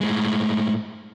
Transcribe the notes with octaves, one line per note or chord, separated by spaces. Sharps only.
A2 G#3